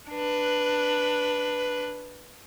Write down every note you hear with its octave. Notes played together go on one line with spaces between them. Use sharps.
D4 B4